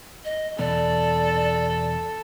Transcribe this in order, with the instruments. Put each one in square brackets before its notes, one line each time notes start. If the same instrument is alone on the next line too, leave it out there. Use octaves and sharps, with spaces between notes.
[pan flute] D#5
[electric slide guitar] E2 B2 [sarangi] A4 [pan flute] D5